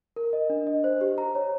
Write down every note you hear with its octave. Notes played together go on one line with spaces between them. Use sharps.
A#4
D#5
D4
D#5
C5
G4
A#5
C#5